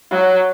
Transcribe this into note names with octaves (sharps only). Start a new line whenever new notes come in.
F#3